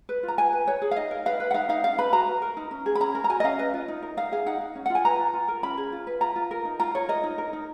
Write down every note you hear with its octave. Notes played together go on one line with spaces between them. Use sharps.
B4
F4
A#5
B4 G#5
B4
B4 C#5
G#4
F5
D#4 D#5
A#4
B4 F5
B4
F#5
D#4 F5
D#4 F5
C#4 F5
B4 B5
F#4 A#5
B4
A#4
D#4
C#4
G#4
B5
C#4 A#5
A#4
A#5
F#4 G#5
D#5
C#4 F5
B4 D#5
F4
D#4
A#4
D#4 F5
G#4 F5
D#4 F#5
D#4
C#4
F#5
F4 G#5
B4 A#5
F4
F4
A#4
C#4 B5
G#4
F4
B4
F4 A#5
F4
A#4
D#4
F4 A#5
F4 C#5
A#4 D#5
D#4
A#4
D#4